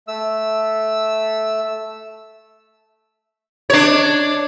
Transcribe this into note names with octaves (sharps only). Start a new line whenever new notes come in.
A3 E6
D4 C#5